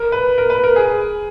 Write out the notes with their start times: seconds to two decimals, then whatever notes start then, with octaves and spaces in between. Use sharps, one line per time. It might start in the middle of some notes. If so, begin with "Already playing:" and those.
Already playing: A#4
0.12 B4
0.38 A#4
0.50 B4
0.64 A#4
0.76 G#4